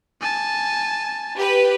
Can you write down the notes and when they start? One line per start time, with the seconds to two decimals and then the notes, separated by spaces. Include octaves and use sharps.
0.21 G#5 A5
1.35 G4 B4